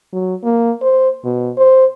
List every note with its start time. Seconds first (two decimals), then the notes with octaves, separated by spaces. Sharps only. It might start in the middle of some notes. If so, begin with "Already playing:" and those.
0.13 F#3
0.43 A#3
0.82 C5
1.24 B2
1.57 C5